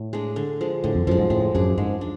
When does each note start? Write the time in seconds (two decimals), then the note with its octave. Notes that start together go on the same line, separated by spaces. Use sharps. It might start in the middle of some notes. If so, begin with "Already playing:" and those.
Already playing: A2
0.13 G#3 D4
0.36 D3
0.61 F3 G#3
0.84 A2 D3
0.95 F2
1.07 F#2 F3 G#3
1.19 G#2
1.30 A2 G#3
1.55 F#2 D4 G#4
1.78 G#2 G#3
2.01 D4